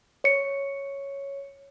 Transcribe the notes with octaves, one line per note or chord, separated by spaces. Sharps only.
C#5 C#7